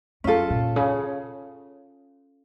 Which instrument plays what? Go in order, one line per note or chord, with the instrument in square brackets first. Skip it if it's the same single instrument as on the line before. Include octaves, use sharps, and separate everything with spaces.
[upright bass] F#2 [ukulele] C#4 F4 A4
[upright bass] A#2
C#3